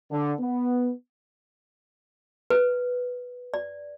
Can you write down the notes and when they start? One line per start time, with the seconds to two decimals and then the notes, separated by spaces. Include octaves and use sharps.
0.11 D3
0.40 B3
2.50 B4
3.54 D5